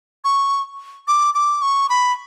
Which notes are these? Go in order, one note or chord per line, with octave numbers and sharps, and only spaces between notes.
C#6
D6
D6
C#6
B5